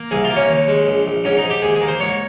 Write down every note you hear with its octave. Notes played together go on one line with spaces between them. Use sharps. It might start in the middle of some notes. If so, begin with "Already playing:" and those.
Already playing: A#3
C2 G#4
F4
A#3
C#4
D#2
G#3
A#1
A#1
G#2 C#4
D#4
G#2
G4
D#2 G#4
G#4
A#3
C5
G#2 C#5